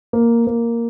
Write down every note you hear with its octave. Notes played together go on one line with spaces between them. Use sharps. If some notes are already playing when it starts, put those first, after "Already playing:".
A#3
A#3